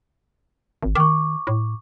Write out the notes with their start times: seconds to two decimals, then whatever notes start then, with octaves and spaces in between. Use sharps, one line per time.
0.83 G#1
0.95 D#3 C#6 D6
1.47 A2